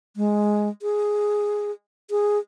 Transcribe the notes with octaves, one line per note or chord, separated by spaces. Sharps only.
G#3
G#4
G#4